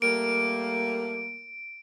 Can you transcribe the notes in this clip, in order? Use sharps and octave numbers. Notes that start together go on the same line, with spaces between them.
G3 A3 A#3 D7